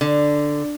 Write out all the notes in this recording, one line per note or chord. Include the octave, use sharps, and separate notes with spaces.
D3